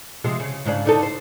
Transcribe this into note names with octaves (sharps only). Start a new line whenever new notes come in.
C3 F3 G#3
C#3
G#2 C#3 D4
D3 D#4 A4
C5